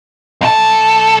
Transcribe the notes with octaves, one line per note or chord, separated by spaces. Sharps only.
B1 A4